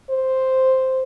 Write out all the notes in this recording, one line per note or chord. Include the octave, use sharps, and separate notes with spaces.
C5